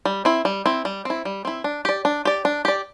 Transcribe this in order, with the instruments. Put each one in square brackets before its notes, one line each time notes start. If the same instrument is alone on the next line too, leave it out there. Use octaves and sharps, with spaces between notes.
[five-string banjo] G3
C4 E4
G3
C4 E4
G3
C4 E4
G3
C4 E4
D4
G4 D5
D4
G4 D5
D4
G4 D5